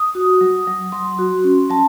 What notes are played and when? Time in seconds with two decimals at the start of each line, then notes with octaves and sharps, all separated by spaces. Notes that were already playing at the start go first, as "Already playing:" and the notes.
Already playing: D#6
0.15 F#4
0.41 F#3
0.67 F#3
0.92 F#3 C6
1.19 F#4
1.44 C#4
1.70 F#3 A5